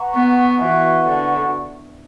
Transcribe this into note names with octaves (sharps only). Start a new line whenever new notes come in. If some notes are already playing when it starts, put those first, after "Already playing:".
Already playing: B4 F#5 A#5 C#6
B3
E3 F#4 B4 F#5 C#6
D3